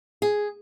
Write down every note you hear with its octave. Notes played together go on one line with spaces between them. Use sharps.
G#4